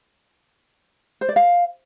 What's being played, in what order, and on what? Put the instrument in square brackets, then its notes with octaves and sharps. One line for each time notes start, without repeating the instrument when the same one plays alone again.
[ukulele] C5
D5
F5